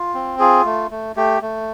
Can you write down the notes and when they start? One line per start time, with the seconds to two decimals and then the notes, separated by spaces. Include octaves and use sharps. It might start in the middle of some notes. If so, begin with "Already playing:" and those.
Already playing: F4
0.14 C4
0.39 F4 G#4
0.65 A3
0.91 A3
1.16 A3 G4
1.42 A3